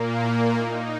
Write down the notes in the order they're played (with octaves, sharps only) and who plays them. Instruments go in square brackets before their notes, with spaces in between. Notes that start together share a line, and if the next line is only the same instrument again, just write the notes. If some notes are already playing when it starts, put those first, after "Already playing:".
Already playing: [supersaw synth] A#2 A#3
E4
D#4